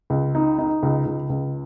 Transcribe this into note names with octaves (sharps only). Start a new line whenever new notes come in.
C#2
D#4
D#4
C#2
C#2
C#2